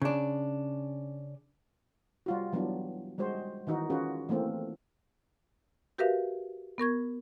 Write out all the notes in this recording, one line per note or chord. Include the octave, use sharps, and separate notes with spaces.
C#3 D4
G3 F4 F#4
E3 F#3 G3 B3 D4
G3 G#3 F#4 C5
D#3 E3 D#4 F#4
C#4 F4 F#4 G#4 B4
E3 A3 A#3 C4
F#4 G4 A#4 B4 E5 F5
B3 A#4 C#6 G#6